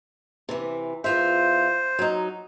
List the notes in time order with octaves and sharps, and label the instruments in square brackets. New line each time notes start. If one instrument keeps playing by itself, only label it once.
[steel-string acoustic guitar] C3 E3
[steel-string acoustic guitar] E2 F4 E5 [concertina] C5
[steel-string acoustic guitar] F#3 D#4